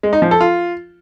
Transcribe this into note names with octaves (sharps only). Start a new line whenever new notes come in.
G#3
D#4
F3
A4
F4